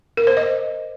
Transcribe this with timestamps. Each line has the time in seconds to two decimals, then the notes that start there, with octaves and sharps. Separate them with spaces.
0.17 A#4
0.27 C5
0.37 D#5